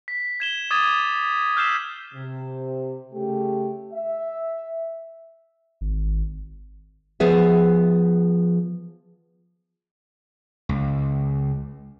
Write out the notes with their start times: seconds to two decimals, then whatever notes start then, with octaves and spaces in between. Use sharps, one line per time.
0.08 B6
0.40 G#6 E7 G7
0.71 D6 D#6 G#6 A6 D#7
1.56 E6 F6 G6 B6 C7 E7
2.14 C3
3.13 C#3 A3 G4
3.94 E5
5.81 G#1
7.20 F3 B3 G#4 E5
10.69 C#2